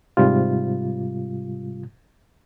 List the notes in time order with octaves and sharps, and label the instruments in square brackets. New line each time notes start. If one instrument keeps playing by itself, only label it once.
[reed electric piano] G#2 C3 G3 F4